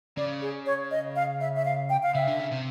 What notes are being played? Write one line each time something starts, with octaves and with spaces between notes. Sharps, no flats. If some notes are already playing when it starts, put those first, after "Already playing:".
C#3 D5
G#4
C#5
D#5
F5
E5
E5
F5
G5
F5
C#3 E5
D3
C#3
C3